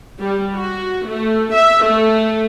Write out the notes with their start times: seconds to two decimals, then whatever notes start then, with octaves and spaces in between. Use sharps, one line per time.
0.19 G3
0.56 F#4
1.08 A3
1.54 E5
1.85 A3